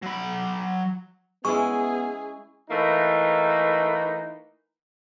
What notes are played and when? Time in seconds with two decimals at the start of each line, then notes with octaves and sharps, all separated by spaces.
0.03 F#3 B5
1.45 G#3 B3 C#4 E4 G#4 C#6
2.70 E3 A3 A#3 D#4 B4